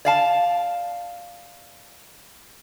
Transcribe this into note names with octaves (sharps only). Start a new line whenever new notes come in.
D5 F5 A5